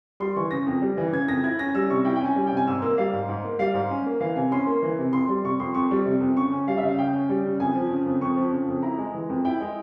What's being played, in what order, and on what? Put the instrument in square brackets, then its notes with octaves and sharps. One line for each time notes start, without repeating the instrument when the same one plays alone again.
[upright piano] G3 C6
E3 C#6
C#3 A#6
F2
G3
E3
C#3 G#6
F2 A#6
E4 G#6
C#4 A#6
G3 E6
C3 C#6
E4 G5
G5
C#4 G#5
G3 G#5
G5
C3
G#5
G#2 E6
A#3 E6
G3 F5
G#2
G#2
A#3
G3 F5
G#2
C#4
A#3
E3 F5
C3 G#5
C#4 C6
A#3
E3
C3
F2 C6
G3
C3 C#6
F2 C6
F2 C#6
G3
C3
F2
C#3 C#6
C#4
G3 F5
E5
C#3
F5
C#3 G5
C#4
G3
C#3
F2 G#5
F3
C#3
F2
F2 C#6
F3
C#3
F2
E4 A#5
G#3
E3
F2
E4 G5
G#3